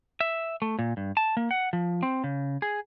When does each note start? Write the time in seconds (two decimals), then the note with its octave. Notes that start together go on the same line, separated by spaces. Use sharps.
0.21 E5
0.62 A3
0.79 A#2
0.97 G2
1.17 A5
1.37 A#3
1.51 F#5
1.73 F3
2.03 C4
2.24 C#3
2.62 G#4